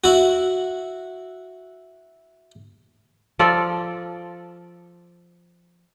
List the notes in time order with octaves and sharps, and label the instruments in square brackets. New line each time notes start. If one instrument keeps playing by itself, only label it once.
[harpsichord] E4 F#4
[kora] F3 F4 A4 D5